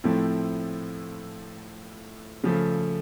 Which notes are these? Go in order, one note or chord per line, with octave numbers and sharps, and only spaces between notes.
A2 F3 A3 C4 E4
C#3 F3 A3